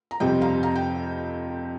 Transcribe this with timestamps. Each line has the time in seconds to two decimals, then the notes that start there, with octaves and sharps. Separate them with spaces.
0.11 A#5
0.20 F2 C3 G3 C4 D#5 G5
0.41 F5 A#5
0.63 F5 A#5
0.76 G5